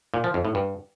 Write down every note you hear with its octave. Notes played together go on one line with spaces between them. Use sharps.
A#2
F3
F2
A2
G2